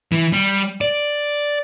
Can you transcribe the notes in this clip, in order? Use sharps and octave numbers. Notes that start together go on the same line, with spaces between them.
E3
G3
D5